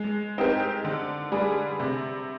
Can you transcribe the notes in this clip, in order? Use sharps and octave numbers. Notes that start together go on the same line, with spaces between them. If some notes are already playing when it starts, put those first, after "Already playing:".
Already playing: G#3
C4 D#4 G4 A#4
D3
G3 D4 G#4
C3